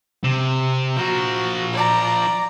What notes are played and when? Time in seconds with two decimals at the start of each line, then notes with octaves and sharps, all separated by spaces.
0.24 C3
0.96 F3 F#4 A#4
1.73 D5 A#5